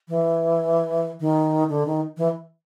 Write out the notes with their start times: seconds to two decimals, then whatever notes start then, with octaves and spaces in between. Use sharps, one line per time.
0.09 E3
1.20 D#3
1.69 D3
1.86 D#3
2.17 E3